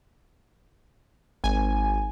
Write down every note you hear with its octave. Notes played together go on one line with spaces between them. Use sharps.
G#1 G#5